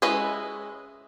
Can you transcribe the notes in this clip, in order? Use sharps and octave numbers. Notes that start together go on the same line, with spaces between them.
G#3 C#4 E4 B4 D#5